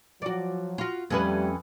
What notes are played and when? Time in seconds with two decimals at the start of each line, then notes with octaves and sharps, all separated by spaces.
0.22 F3 F#3 F#4 D5
0.78 F4 F#4
1.10 F2 G3 A3 C#4 B4